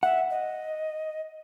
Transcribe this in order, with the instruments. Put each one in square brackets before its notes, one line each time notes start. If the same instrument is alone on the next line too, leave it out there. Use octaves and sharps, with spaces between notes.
[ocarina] E5 [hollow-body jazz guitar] F#5
[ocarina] D#5